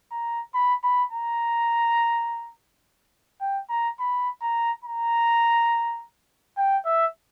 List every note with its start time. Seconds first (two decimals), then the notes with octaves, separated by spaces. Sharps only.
0.12 A#5
0.54 B5
0.84 B5
1.12 A#5
3.41 G5
3.70 A#5
3.99 B5
4.41 A#5
4.85 A#5
6.57 G5
6.86 E5